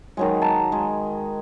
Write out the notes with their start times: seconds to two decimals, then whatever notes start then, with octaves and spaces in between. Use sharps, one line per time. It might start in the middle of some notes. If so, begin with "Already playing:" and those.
0.17 D#3 F#3 G#3
0.42 A5 A#5
0.72 G#3